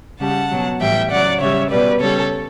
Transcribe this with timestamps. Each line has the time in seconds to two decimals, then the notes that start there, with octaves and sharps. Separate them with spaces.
0.20 C#3 G3 F#5 A5
0.51 B2 F#3
0.80 A2 E3 G3 E5 G5
1.10 C#3 F#3 D5 F#5
1.40 C#3 G3 C#5 E5
1.70 B2 G3 B4 D5
2.00 C#3 G3 A4 C#5